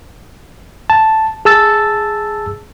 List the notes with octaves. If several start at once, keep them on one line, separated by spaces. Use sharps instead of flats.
A5
G#4 A5 E6 A6